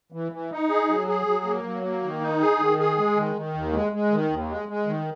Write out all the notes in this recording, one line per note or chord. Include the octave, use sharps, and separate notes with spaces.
E3
E3
D#4
G#4
F#3
G#4
F#3
A#3
F#3
A#3
D#3
D#4
G#4
D#3
G#4
G#3
D#3
D#3
D#2
G#3
G#3
D#3
D#2
G#3
G#3
D#3